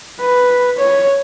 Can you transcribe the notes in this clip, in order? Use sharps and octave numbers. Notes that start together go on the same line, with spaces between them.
B4
C#5